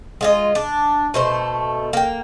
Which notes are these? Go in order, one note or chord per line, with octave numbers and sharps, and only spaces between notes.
G#3 F4 D#5
D4
B2 A3 C5
A#3 G5